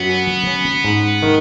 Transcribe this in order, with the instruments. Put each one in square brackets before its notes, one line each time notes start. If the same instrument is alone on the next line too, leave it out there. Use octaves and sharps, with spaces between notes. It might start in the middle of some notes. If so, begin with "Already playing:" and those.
Already playing: [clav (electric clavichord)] F#2 F#3 [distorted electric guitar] B3
[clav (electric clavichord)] C#4
C#4
G#2
D#3